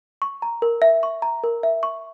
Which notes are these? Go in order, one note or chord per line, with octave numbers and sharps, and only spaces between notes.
C#6
A#5
A#4
E5
C#6
A#5
A#4
E5
C#6